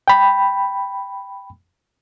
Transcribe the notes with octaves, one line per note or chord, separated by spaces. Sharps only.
G5 B5